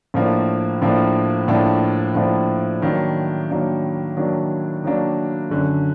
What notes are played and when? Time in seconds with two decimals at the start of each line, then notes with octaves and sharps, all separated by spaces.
0.14 A2 F3 A#3 D4
0.82 A2 F3 A#3 D4
1.48 A2 F3 A#3 D4
2.15 A2 F3 A#3 D4
2.82 D#3 F#3 A#3 D4
3.50 D#3 F#3 A#3 D4
4.17 D#3 F#3 A#3 D4
4.84 D#3 F#3 A#3 D4
5.50 F#2 D3 F#3